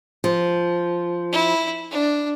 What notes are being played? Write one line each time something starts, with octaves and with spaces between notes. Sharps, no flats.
F3
E4
D4